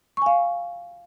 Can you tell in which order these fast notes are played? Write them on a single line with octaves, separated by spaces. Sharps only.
C#6 G#5 F5